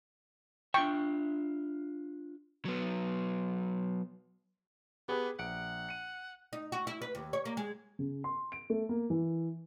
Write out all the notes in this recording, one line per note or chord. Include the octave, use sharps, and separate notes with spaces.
D4 F4 E5 G5 C#6
F#3 B3
B3 G4 G#4 B4
A#1 F#5 C#7 D7
C#7 D#7
D#4
F#4
E4
B4
D#2
C#5
A#3
G#3
C#3
C6
D7
A3
A#3
E3